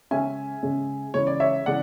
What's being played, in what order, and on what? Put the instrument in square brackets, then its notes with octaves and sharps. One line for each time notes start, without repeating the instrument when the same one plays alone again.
[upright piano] C#3 G#3 C#4 E5 G#5
C#3 G#3 C#4
C#3 E3 G#3 C#5
D5
C#5 E5
C#3 E3 G#3 D5 F#5